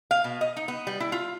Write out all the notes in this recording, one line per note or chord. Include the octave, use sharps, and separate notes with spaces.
F5
B2
D#5
D#4
B3
G3
E4
F4